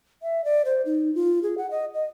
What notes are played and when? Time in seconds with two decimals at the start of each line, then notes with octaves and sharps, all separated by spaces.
0.23 E5
0.45 D5
0.65 C5
0.86 D#4
1.15 F4
1.43 G#4
1.58 F#5
1.71 D#5
1.94 D#5